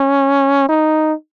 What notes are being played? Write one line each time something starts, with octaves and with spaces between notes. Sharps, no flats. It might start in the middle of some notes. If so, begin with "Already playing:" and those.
Already playing: C#4
D#4